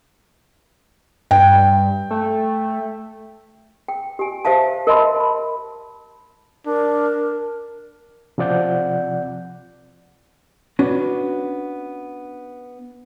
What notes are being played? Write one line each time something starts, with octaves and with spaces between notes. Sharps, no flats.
G2 G5
A3
G5
G4 G#5
G4 C5 E5 F5 A5
A#4 D#5 E5 A5 B5 C6
A5 B5
D4 A#4
C3 F3 C4 D5 F#5 G6
B3 C#4 D4 F#4